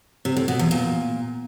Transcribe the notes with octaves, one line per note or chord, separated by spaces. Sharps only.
C3
A2
B2
E2
A#2